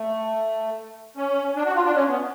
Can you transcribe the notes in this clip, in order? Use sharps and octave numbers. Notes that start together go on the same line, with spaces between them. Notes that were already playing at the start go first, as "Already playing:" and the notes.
Already playing: A3
C#4
D4
F#4
F4
D4
C#4
B3